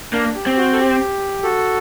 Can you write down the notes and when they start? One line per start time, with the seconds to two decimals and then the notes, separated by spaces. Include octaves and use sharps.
0.13 A#3 D4
0.35 G4
0.46 C4
0.57 F#4
0.73 A4
0.79 G4
1.43 F#4 A4